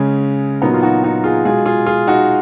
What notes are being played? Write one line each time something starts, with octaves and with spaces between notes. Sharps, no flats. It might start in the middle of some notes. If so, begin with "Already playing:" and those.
Already playing: C#3 G#3 C#4
A#2 F#3 B3 D#4
F4
D#4 F#4
D#4 F#4
F4 G#4
B2 G#3 F4 G#4
F4 G#4
F4 G#4
D#4 F#4